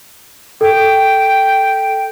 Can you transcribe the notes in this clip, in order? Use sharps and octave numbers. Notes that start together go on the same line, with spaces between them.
A4 G5